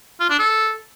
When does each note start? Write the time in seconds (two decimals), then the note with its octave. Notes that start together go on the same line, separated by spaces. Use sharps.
0.20 F4
0.30 D4
0.39 A4